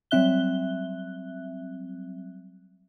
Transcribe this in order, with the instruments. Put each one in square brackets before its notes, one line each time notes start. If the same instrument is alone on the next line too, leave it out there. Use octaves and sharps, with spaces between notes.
[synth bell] F#3 G3 C4 E5 F#6 G7